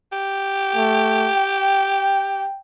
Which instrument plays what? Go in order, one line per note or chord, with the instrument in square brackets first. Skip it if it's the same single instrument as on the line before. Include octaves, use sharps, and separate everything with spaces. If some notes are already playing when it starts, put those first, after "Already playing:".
[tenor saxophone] G4
[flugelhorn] A3
G5